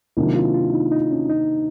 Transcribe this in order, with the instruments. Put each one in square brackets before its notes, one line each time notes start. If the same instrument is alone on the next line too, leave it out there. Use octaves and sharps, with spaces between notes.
[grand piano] C3 D#3 F#3 A#3 D4 [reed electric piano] E4
[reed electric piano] F4
F4
D#4
D#4
C#4
D#4